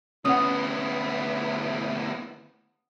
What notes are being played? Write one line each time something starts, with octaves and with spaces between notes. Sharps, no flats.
D2 B3 C#4 E4 F#5 D#6